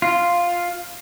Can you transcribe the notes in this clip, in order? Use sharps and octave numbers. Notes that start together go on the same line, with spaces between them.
F4